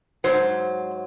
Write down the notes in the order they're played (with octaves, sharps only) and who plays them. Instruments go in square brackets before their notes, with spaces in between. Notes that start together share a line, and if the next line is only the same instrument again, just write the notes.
[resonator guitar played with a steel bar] G#2 D#3 F#3 C5